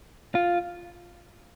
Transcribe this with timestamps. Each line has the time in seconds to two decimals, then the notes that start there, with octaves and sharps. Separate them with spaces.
0.35 F4